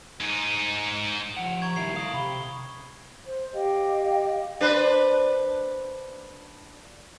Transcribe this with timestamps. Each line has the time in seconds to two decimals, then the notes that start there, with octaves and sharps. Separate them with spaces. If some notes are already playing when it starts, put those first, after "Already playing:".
0.20 G#2 D#4
1.37 F3 F#5
1.62 A#5 C#6 G#6
1.76 D#3 G3 E4 C7
1.96 A4 F5 D#6
2.13 C3 B5 G7
3.25 C5
3.54 G4 D#5 F5 G5
4.61 D4 B4 C5